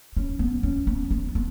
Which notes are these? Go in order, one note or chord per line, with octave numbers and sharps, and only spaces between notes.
C#4
B3
C#4
B3
B3
B3